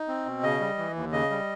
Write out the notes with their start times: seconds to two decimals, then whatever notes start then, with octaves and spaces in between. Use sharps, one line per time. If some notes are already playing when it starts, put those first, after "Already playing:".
Already playing: D#4
0.08 C4
0.26 B2
0.43 C#3 D#5
0.60 G3
0.78 E3
0.95 D#2
1.12 C#3 D#5
1.30 G3